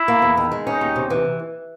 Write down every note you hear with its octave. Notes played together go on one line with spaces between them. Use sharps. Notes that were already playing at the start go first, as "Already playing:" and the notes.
Already playing: E4
A#3
E2
D#3
G#3
C#4 D#4
D#2
C3
E3